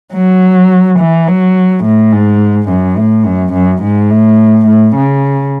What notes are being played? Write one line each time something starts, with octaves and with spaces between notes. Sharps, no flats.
F#3
E3
F#3
A2
G#2
F#2
A2
F#2
F#2
G#2
A2
A2
C#3